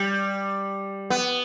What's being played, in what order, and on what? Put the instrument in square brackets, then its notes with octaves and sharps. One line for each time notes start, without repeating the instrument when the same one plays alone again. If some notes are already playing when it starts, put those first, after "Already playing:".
Already playing: [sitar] G3
B3